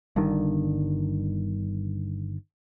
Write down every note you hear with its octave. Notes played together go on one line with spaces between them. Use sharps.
G1 G2 D3 D#3